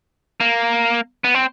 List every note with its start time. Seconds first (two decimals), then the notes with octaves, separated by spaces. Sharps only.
0.40 A#3
1.24 B3
1.34 C4